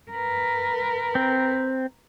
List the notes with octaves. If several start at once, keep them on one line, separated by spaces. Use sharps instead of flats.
A#4 B4
C4